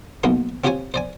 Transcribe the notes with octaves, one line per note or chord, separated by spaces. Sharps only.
B1 A#3 B3 D#4 C6
C4 F4 G4 C5 C#5 G#5
C5 D5 G#5